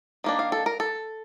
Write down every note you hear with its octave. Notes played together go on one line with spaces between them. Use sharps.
D#3 A#3 D4
F5
A4
A#4
A4